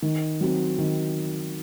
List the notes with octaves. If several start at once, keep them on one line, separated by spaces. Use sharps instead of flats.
D#3
F#3 C4 F#4
D#3